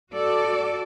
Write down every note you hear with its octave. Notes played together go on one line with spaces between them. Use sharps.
F#4 A4 D5